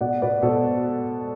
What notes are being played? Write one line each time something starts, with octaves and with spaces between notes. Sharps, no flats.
B2 D5 F#5
B2 B4 D5
B2 A4 C5